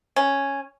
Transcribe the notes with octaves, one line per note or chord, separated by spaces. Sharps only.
C#4